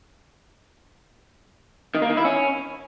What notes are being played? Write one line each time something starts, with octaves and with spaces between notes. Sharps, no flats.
D#3
A#3
D#3
E4
C#4